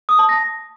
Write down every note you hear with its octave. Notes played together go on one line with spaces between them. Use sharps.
D#6
A5
A#6